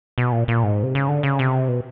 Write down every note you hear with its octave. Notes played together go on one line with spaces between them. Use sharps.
B2
A#2
A#2
G#2
C3
C#3
D3
C#3
C3
B2